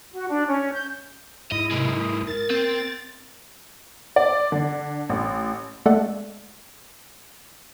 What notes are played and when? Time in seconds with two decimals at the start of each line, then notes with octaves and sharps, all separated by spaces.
0.12 F#4
0.29 D4
0.48 C#4
0.73 G6
1.52 G#2 E4 D#5
1.71 C3 G#3 A#3
1.88 D#6
2.27 A#4 A6
2.51 C4
4.16 D5
4.52 D3
5.09 A1
5.86 G#3 A3 A4 D5 E5 F#5